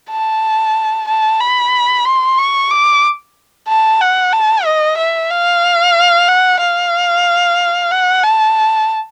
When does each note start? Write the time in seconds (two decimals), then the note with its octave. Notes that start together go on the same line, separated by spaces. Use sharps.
0.11 A5
1.08 A5
1.40 B5
2.05 C6
2.38 C#6
2.70 D6
3.68 A5
4.01 F#5
4.33 A5
4.66 D#5
4.98 E5
5.31 F5
6.28 F#5
6.60 F5
7.91 F#5
8.24 A5